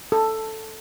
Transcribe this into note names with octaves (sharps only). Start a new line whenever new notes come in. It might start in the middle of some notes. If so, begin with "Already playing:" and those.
A4